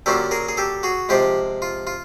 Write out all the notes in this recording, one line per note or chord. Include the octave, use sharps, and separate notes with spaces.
D3 F#3 A#3 C#4 F4 G4 A4
G#4 A#4
G#4
G4 A4
F#4 G#4
C3 F3 G#3 F4 G4
F4
F4